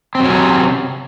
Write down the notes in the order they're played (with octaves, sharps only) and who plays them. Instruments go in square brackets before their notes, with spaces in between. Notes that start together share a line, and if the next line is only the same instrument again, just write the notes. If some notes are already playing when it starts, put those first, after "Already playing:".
[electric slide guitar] C4
F#3
C#4
C3